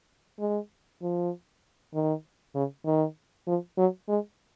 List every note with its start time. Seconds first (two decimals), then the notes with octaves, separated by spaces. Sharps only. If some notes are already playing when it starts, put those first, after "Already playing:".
0.40 G#3
1.02 F3
1.94 D#3
2.55 C#3
2.85 D#3
3.47 F3
3.78 F#3
4.08 G#3